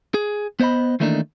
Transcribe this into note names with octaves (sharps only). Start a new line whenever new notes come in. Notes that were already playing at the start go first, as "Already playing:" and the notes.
G#4
B3 C5 C#5 D#5 B5
D#3 E3 A3 A#3 D4 D#4